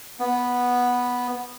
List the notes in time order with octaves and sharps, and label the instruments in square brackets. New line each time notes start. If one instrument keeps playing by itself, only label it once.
[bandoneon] B3